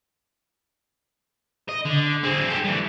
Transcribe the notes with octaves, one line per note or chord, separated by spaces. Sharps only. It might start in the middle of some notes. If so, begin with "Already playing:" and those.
D#5
D3
C4 G#4
G4 A4
G2 E3